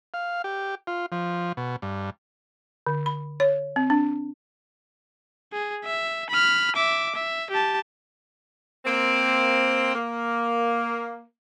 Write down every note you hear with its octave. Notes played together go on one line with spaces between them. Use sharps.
F5
G4
F4
F3
B2
G2
D3
B5
C#5
C4
D4
G#4
E5
B5 F6
E5 D6
E5
G4 A5
A#3 C4
A#3